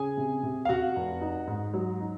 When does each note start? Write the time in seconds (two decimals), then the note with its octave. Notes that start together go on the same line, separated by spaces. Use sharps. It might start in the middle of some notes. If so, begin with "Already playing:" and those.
Already playing: C#3 G#4 G#5
0.17 C3
0.43 C3
0.65 F5
0.69 C3 F#4 F#5
0.96 F1
1.21 D#4
1.47 G#2
1.74 F#3
2.00 D#4